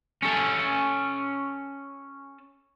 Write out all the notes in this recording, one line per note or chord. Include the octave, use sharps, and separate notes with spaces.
C#4 A4